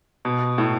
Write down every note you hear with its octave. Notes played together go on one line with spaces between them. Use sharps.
B2
A2